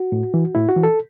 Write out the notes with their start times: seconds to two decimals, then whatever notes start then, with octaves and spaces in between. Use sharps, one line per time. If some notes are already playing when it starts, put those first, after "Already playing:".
Already playing: F#4
0.12 A2
0.34 E3
0.55 A2 E4
0.69 F#4
0.76 E3
0.83 A4